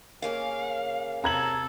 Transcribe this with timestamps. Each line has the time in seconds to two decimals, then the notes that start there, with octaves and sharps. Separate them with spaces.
0.22 C#3 A#3 C#4 F5
1.24 C3 A4 A#5 G#6 F#7